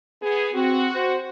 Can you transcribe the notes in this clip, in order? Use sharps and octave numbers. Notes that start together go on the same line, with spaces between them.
B3 G#4
C4 F#4
C5